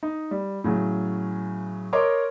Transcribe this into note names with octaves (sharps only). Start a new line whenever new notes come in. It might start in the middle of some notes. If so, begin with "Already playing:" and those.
D#4
G3
A2 C#3 F#3
A#4 C#5 D#5 C6 D6